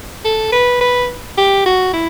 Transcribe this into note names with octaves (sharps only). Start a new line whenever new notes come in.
A4
B4
B4
G4
F#4
E4